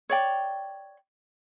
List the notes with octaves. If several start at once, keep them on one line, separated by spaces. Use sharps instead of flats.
C#5 D5 G5